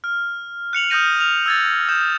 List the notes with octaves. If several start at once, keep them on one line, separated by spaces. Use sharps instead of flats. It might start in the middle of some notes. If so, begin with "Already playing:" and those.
F6
F#6 C#7 F7 F#7
D#6 F6 G6 A#6 D#7
F6 F7
E6 G#6 A6
D#6 G6 E7